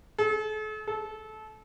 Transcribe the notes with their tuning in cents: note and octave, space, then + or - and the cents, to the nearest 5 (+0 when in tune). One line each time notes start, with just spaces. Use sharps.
A4 -40
A4 -20